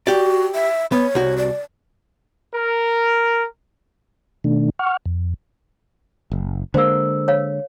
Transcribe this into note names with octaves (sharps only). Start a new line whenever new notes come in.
F#4 G4 D5
E5
B3 C#5
C2 F#4
D5
A#4
B2 D#3 A3 D4
F#5 C#6 F6
F2
F#1
D3 G#3 A#3 C5 E6
C#5 F5